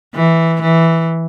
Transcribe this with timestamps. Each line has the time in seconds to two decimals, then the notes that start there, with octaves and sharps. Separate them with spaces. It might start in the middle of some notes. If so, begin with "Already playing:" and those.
0.15 E3
0.62 E3